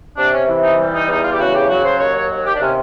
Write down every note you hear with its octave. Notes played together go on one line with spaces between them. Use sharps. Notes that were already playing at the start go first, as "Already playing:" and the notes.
C3 D4
C#4
E3
D#4
G3
D#4
E2 D#4
F4
G4
C#3 F#4
G4
F#3 F#4
C5
D#2 C#5
C#5
D#2
G4
D4
C3 C#4